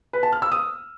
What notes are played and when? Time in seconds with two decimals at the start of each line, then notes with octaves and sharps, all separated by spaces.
0.13 B4
0.23 A5
0.32 F6
0.42 E6
0.52 D#6